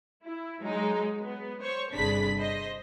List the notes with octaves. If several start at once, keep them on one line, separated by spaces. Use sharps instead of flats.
E4
F#3 G#3 D#4
B3
C5 C#5 C#6
G1 C3 D4 G#4 B5 B6
C5 D#5